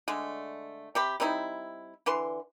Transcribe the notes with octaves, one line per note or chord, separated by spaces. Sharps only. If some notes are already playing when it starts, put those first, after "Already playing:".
D3 G#3 A3
C3 G4 B5
G3 C4 D#4 E4
D3 E3 B4 C6